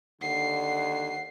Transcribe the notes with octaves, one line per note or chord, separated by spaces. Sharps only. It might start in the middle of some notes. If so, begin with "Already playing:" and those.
D#2 D3 F#5 C7